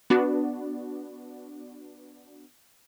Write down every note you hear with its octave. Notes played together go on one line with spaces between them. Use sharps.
B3 D4 F#4